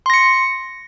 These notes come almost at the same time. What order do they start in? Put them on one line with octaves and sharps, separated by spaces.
C6 A#6 C#7